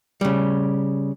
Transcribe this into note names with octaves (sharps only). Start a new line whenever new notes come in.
C#3 G3